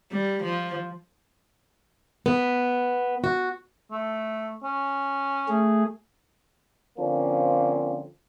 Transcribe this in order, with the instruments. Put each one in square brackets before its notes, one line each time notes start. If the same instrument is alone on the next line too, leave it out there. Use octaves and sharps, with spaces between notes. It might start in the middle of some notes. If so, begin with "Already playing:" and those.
[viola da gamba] G3
F3
[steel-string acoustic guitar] B3
F#4
[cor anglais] A3
C#4
[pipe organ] A3 G#4
[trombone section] D3 F3 A#3 C4 C#4